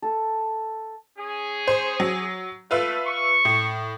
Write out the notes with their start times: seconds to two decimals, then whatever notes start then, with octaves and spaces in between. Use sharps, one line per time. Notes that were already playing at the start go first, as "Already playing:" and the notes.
0.02 A4
1.19 C#4 G#4
1.68 C5
2.00 F#3
2.71 A3 F4 B4 E5
3.07 C#6
3.45 A2